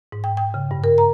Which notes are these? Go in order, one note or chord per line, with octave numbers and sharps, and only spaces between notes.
G#2
G5
G5
C#3
G2
A#4
A#5